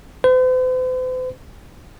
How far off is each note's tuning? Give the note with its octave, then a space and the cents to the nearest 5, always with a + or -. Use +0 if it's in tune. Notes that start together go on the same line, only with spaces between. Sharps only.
C5 -45